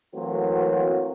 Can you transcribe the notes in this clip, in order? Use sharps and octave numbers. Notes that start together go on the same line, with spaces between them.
E3 F#3 A3 A#3 C4 F#4